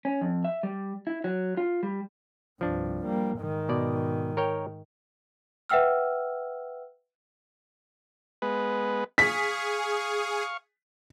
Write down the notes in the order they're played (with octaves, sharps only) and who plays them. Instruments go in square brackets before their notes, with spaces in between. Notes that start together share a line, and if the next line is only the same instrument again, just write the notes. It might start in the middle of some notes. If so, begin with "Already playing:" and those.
[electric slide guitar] C#4
F2
E5
G3
E4
F#3
F4
G3
[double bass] C2 G2 [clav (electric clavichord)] F3 D4
[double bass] G3 A#3
G#2 D#3
[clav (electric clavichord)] B2 D5
A#4 C#5 G5
[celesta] B4 E5 F#5 G5 E6 F6
[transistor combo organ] G#3 B3 B4
[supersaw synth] G#4 [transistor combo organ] F5 C#6 [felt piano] B6